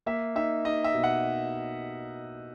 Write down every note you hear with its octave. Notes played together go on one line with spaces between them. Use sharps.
A#3 E5
D#4 E5
D#4 D#5
E5
B2
F#5